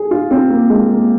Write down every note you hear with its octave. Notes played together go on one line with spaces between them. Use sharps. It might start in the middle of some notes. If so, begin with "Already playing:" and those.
Already playing: G#4
F4
C4
A#3
G#3
A#3